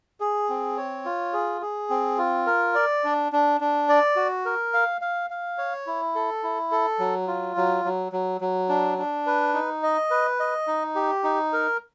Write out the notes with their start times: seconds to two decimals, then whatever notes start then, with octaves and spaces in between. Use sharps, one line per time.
0.20 G#4
0.49 C4
0.77 C#5
1.05 F4
1.33 G#4
1.61 G#4
1.90 C4
2.18 F4
2.47 A#4
2.75 D5
3.04 D4
3.32 D4
3.61 D4
3.89 D5
4.16 F#4
4.46 A#4
4.74 F5
5.01 F5
5.30 F5
5.58 C#5
5.87 E4
6.15 A4
6.43 E4
6.72 A4
6.99 F#3
7.27 F4
7.57 F#3
7.85 F#3
8.12 F#3
8.41 F#3
8.69 D4
8.98 D4
9.26 B4
9.54 D#4
9.83 D#5
10.11 B4
10.40 D#5
10.67 D#4
10.95 G4
11.24 D#4
11.53 A#4